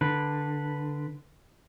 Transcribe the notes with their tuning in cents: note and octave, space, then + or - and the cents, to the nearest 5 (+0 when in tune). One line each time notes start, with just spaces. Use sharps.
D3 +0 B4 -10